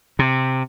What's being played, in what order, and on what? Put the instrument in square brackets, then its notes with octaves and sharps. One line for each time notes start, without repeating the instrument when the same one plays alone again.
[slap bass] C3